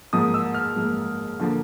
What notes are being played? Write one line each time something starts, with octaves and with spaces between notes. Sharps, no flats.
G#2 F3 A#3 D#6
E6
F6
G#2 F3 A#3
D3 F3 A#3